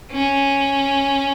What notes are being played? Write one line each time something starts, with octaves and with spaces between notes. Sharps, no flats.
C#4